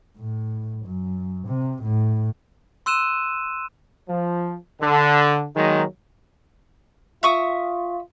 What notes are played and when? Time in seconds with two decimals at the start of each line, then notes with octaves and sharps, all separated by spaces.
0.18 A2
0.85 F#2
1.48 C3
1.83 A2
2.86 C6 E6 F#6 D#7 E7
4.09 F3
4.82 D3
5.56 D#3 F#3 G#3 A#3 D#4
7.23 F4 E5 C#6 D#6